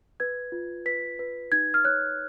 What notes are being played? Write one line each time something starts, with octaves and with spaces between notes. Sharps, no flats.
B4 G#6
F4
B4 B6
B4
D#4 G#6
F6
C#5 F#6